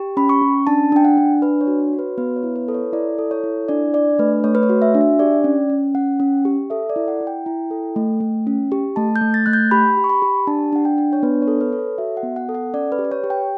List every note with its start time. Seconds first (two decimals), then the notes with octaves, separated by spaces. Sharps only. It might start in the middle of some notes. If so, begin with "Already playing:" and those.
Already playing: G4
0.17 C#4 B5
0.29 C#6
0.42 C#4
0.67 D4 A5
0.92 D4 G5
1.05 F#5
1.17 D4
1.42 D4 B4
1.61 C#5
1.67 F#4
1.80 C#5
1.93 F#4
1.99 B4
2.18 B3 B4
2.36 C#5
2.43 E4
2.56 B4
2.68 A4 B4
2.74 C#5
2.93 E4 D5
3.18 A4
3.31 C#5
3.44 E4
3.68 D4 D5
3.94 D4 D5
4.19 A3 B4
4.44 A3 C#5
4.55 B4
4.63 C#5
4.69 F#4
4.82 E5
4.95 D4
5.01 E5
5.19 G4 D5
5.44 C#4
5.70 C#4
5.95 C#4 F#5
6.20 C#4
6.45 G4
6.70 A4 E5
6.90 D5
6.96 E4
7.08 F#5
7.21 E4
7.27 G5
7.46 E4
7.71 A4
7.96 A3
8.21 A3
8.47 C#4
8.72 G4
8.96 A3 A5
9.16 G6
9.21 A3
9.34 A6
9.46 A3 F#6
9.53 G6
9.71 G4 B5
9.97 G4
10.04 C#6
10.09 B5
10.22 G4
10.47 D4 A5
10.72 D4 F#5
10.85 G5
10.98 D4
11.13 C#5
11.23 B3 B4
11.42 C#5
11.48 A4
11.61 B4
11.73 A4
11.79 C#5
11.98 F#4 E5
12.17 F#5
12.23 B3
12.36 F#5
12.49 A4
12.55 F#5
12.74 C#4 D5
12.92 B4
12.99 G4
13.04 B4
13.11 C#5
13.24 G4
13.30 G5